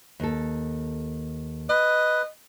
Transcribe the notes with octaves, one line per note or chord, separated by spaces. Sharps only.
D#2 A4
B4 D#5